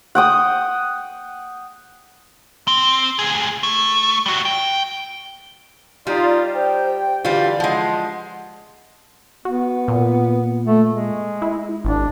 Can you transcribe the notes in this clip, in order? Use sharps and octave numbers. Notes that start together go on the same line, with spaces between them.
F#5 G5 D#6
C4
D2 G#4
A3
G3 F#4
G5
G3 D#4 F4 D5
C5 G5
D3 E3 G3 F4 F#4
F3 G#3 F#5
B3 F#4
A#2
A3
G#3
E4
G#1 D4